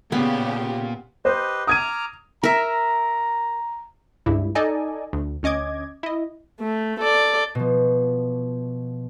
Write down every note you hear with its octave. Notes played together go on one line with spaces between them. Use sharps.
A#2 C#3 B3 F4 G4
G4 B4 C5 D#5
A#5 D6 D#6 F6 G#6 D#7
A#4 E5 A#5
C#2 G2 E4
D#4 A4 D5 D#5 G#5
D2
D2 C#4 D#5 D6 G#6
E4 D#5
A3
A4 D5
B2 F3